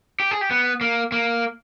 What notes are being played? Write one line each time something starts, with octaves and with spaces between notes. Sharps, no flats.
G4
G#4
G4
B3
A#3
A#3